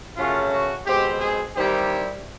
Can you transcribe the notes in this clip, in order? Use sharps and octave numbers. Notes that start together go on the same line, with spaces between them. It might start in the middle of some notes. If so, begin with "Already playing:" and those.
F#2 C#3 F#3 A3 C#4 F4
F#4
B2 G#3 C4 G4
G#4
D#3 G3 C4 E4 G4